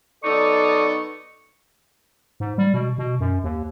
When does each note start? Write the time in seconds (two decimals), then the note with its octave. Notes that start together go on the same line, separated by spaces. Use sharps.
0.24 F#3 B3 D#4 A4 D5 C#6
2.40 G#2
2.58 G3
2.74 B2
2.98 B2
3.20 F#2
3.44 D#2